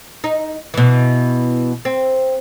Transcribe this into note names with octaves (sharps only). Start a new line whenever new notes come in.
D#4
B2 E3
C4